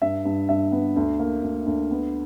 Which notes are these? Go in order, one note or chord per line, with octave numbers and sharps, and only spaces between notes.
G2 E5
G2
G2 E5
B3
D2
A#3
D2
D2
B3